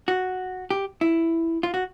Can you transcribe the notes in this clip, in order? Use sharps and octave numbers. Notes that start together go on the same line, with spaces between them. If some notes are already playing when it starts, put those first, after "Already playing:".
F#4
G4
E4
F4
F#4